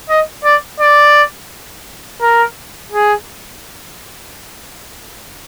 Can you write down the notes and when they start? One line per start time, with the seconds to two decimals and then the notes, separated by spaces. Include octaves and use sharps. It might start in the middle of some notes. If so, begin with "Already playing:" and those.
0.10 D#5
0.45 D5
0.80 D5
2.22 A#4
2.92 G#4